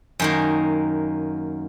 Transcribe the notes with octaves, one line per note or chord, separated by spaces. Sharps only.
F#2 D#3 A#3